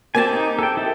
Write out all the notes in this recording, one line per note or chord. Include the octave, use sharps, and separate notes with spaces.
A#3 C4 G4 G#5 A5
D#4
A4 G5
E4 A4